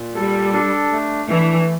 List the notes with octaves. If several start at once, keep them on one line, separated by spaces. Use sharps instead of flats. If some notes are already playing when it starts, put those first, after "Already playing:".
Already playing: A#2
G3 A4
D4
A3
E3 D4